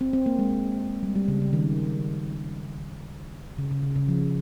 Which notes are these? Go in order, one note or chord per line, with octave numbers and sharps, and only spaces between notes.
C4
C4
A#3
G#3
G3
G3
C#3
C#3
D#3
C#3
C#3
C#3
C#3
F3